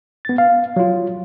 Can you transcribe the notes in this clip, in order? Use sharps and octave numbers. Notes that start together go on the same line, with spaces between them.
B3 A6
F5
F#3 F4